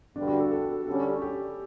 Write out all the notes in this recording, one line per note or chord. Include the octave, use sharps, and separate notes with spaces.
G2 D3 G3 D4
F#4
A4
A4
D3 G3 C#4 A4
G4